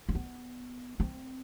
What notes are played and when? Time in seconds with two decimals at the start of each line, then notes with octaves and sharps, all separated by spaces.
0.09 C4
0.15 B3
1.00 C4